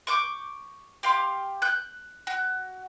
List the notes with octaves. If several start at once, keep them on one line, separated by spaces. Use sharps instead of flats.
C#6 D6 G6
G4 F5 C6
F#6 G6
F#4